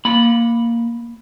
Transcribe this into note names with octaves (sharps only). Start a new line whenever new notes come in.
A#3 B5